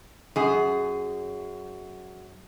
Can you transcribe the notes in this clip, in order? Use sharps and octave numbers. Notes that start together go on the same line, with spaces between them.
F#2 G#4